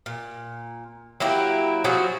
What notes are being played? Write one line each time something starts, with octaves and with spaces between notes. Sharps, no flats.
A#2
F#3 A#3 E4 G4
F3 F#3 F#4 G#4